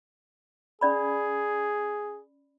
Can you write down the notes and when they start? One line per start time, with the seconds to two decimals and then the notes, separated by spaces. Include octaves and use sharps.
0.81 C#4 G#4 D5 B5